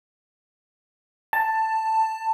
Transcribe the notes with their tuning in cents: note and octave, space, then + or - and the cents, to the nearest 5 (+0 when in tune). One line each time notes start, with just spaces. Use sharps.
A5 +10